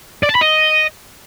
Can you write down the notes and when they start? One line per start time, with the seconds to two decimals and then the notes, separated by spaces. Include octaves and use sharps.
0.23 D5
0.29 A5
0.35 B5
0.41 D#5